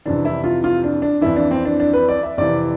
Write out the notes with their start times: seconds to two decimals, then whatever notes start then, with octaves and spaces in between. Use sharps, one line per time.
0.06 F2 C3 E3 D4
0.25 E4
0.44 F4
0.64 F4
0.84 D4
1.02 D4
1.21 F2 E3 E4
1.36 D4
1.51 C4
1.65 D4
1.80 D4
1.94 B4
2.09 D5
2.23 E5
2.37 F2 C3 E3 D5